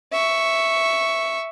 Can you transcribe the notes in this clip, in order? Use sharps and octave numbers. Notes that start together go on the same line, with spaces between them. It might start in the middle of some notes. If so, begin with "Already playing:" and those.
E5 C#6